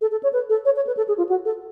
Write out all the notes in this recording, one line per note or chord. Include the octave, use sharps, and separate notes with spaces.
A4
A4
C#5
B4
A4
C#5
C#5
B4
A4
G#4
F4
F#4
A4